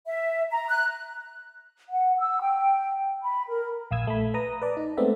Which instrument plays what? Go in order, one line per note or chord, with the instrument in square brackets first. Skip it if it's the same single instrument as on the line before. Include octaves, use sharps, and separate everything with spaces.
[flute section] E5
A#5
F#6
F#5
E6
G5
B5
A#4
[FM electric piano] A#1 F5 D#6 E6 G#6
A3 B5
B4 A#5 D#6
B4 D5 A5
D#4
G#3 A3 B3 C4 D5 E5